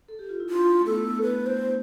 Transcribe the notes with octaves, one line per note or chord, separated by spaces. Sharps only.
A4
G4
F4
E4
D4 F4
A3
B3 A4
B4
C5